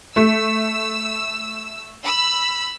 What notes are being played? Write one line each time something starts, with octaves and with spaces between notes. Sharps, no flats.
A3 E6
B5 E6